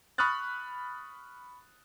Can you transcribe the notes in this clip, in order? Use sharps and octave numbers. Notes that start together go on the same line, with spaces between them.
B5 C#6 D#6 F6 F#6 A6